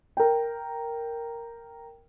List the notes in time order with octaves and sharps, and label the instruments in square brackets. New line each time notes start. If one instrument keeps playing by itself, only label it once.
[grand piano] A#4 G5